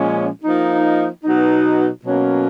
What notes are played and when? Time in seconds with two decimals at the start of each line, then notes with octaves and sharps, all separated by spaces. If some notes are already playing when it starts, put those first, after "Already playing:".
Already playing: A#2 F3 G#3 C#4
0.44 F3 A#3 D#4
1.24 B2 F#3 B3 D#4
2.05 B2 F#3 A#3 C#4